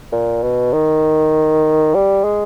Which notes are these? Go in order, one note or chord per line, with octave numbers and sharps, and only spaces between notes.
A#2
B2
D#3
G3
G#3